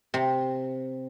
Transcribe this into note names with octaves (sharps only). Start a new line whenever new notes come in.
C3